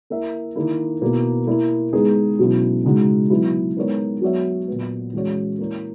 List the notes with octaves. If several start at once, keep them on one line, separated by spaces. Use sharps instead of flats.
A#3 E4 A#4 E5
D#3 A#3 E4
B2 A#3 E4 A#4
A#3 E4 A#4
G#3 B3 D#4 G#4
B2 F#3 C#4 E4
C#3 G#3 D#4 F#4
F#3 B3 E4
G#3 B3 D#4 A#4 C#5
F#3 B3 F#4 C#5 E5
A#2 F#3 B3
E3 G#3 C#4 F#4 C#5
A#3 E4 A#4 C#5